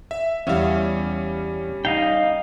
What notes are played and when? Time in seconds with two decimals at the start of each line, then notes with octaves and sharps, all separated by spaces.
0.11 E5
0.47 E2 G3 C#4 E5 F5
1.85 D#4 D#5 F5 G5